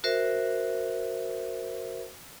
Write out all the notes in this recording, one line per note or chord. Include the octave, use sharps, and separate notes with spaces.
F#4 A#4 C5 E5